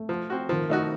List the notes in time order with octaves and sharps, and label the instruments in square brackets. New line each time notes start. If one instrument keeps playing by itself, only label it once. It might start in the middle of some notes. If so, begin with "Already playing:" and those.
Already playing: [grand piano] A3
[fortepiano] F3
C4 F#4
[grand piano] D#3 [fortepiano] F3
[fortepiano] A3 D#4 F#4